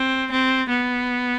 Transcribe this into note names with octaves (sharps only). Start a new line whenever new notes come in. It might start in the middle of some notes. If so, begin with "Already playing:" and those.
Already playing: C4
C4
B3